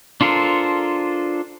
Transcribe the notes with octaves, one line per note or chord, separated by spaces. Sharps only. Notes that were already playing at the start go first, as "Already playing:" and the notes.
D4 F4 A4 A#4 C5